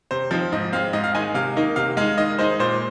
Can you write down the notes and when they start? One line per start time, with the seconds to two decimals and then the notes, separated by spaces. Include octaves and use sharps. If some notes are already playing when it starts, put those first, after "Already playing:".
0.11 C3 C5
0.31 F3 C4 D#4
0.52 G#2 D#5
0.73 G#3 C4 F5
0.93 G#2 D#5
1.04 F5
1.15 D#3 G#3 D#4 G#5
1.34 C3 F5
1.56 D#3 A#3 D#4
1.76 C3 F5
1.97 G#3 D#4 F5
2.18 D#3 D#5
2.39 G#3 D#4 C5
2.59 A#2 C5